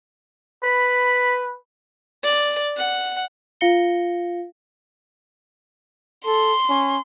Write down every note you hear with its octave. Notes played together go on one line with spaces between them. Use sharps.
B4 B5
D5
F#5
F4 F5 A#6 C#7 G7
A4 C6
C#4